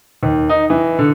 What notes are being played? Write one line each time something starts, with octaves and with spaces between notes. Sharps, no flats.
D#2
D#4
E3
D3